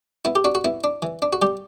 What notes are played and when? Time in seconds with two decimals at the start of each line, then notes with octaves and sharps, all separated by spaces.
0.25 B3 E4
0.35 G4
0.44 D4 F#4
0.55 F#4
0.64 B3 E4
0.84 D4
1.02 E3
1.22 D4
1.33 F#4
1.42 G3 G4